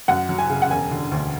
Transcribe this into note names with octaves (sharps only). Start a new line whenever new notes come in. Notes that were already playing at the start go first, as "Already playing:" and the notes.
F#2 F#5
F#3
G#5
C#3
F#5
E1 G#5
D3
D2